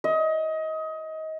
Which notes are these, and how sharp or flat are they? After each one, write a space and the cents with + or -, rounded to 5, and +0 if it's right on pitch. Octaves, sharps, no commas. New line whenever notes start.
D#5 +25